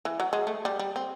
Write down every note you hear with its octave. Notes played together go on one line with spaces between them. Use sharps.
E3
F#3
G#3
A3
G3
G3
C4